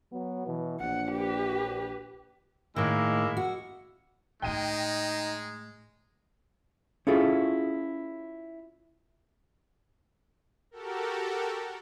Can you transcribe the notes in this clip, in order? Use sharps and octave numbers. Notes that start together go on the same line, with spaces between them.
F#3 B3
B2 E3
A#1 F#5
G4 B4
A2 D#3 G#3 A#3 E4
F#4
A2 G#3 A3 D#4 G5 D#7
C#4 E4 F4 G#4 A4
F#4 G4 A4 A#4